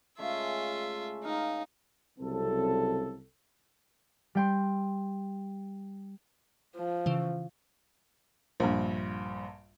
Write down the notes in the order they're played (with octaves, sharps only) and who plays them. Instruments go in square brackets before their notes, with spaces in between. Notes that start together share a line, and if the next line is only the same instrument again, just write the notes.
[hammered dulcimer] C#3 G#3 A3 [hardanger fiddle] F4 E5
[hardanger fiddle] D#4 [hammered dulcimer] A#4 F5
[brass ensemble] C2 C#3 F#3 C4 A4
[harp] G3 G5 C6
[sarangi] F3
[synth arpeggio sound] C#3 E3
[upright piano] A#1 G2